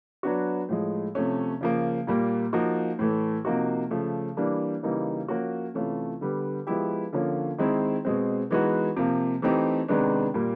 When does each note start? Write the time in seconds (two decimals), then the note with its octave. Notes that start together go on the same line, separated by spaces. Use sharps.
0.23 F#3 B3 D4 F#4
0.69 A2 F3 G#3
1.15 C3 F3 A3 C#4
1.61 C#3 F3 A#3
2.07 A#2 G3 A#3
2.53 F3 A#3 D#4 F#4
2.99 A2 E3 A3
3.45 C3 F3 A#3 D#4 F#4
3.91 C#3 F3 A3
4.37 E3 G3 A#3 D4
4.83 C#3 E3 G3 A#3 D#4
5.28 F3 A#3 C#4 F#4
5.74 C3 E3 A3 C#4 F4
6.21 D3 G3 B3
6.67 F3 G#3 B3 E4 G4
7.13 D3 F3 A#3 C#4 F4
7.58 D#3 G#3 C4 E4
8.05 B2 G#3 C4
8.51 E3 G#3 B3 D#4 F#4
8.96 C3 F3 A#3
9.42 E3 A3 C4 D#4 G4
9.88 C3 D#3 G#3 B3 D4
10.34 A#2 G3 A#3